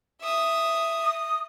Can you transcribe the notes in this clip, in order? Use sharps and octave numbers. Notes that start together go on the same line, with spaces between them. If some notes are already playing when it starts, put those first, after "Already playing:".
E5 D#6
D#6